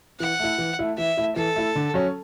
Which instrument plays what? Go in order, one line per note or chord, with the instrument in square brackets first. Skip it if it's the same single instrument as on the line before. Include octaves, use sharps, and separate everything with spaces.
[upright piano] E3 [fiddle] F#5
[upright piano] A3 E4
E3
A3 E4
[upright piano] E3 [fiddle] E5
[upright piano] A3 E4
[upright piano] E3 [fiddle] A4
[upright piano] A3 E4
D3
F#3 C#4